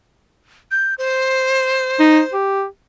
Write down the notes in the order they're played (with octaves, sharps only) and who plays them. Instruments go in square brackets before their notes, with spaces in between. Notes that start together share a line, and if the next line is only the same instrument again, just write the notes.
[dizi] G6
C5
[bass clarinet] D#4
G4